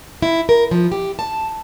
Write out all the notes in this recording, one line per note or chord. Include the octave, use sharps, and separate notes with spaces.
E4
A#4
F3
G4
A5